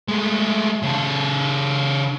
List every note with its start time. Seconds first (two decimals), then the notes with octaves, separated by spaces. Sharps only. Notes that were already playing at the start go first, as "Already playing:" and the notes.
0.08 G#3 A3
0.83 C#3 A4